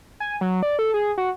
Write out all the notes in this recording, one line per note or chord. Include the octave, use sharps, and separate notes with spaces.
G#5
F#3
D5
A4
G#4
F#4